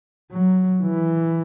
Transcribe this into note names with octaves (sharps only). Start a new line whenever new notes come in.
F#3
E3